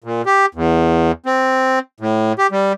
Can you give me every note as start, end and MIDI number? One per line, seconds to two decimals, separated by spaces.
0.04 0.22 46
0.26 0.46 67
0.55 1.12 40
1.26 1.79 60
2.00 2.33 45
2.38 2.47 67
2.51 2.73 55